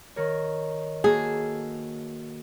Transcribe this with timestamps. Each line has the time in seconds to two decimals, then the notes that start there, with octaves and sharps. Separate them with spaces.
0.16 D#3 A#4 C#5
1.04 A#3 F#4 G#4 A4